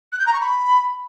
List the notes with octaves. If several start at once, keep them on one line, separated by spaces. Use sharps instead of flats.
F#6
G6
A#5
C#6
B5